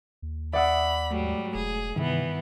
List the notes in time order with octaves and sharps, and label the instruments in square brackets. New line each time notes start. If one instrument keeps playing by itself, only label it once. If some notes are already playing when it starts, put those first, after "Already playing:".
[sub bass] D#2
[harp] D5 F#5 E6 [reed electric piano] E5 D#6 [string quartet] B5
[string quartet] G#2 F#3 G3 [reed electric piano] A3
[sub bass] E1 [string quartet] G#4
[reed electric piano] G2 D#3 [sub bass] C3 [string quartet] E3 B3